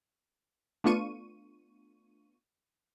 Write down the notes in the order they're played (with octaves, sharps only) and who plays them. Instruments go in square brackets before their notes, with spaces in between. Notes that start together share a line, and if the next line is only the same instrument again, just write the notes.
[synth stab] A3 B3 D4 F4 C#6 D#7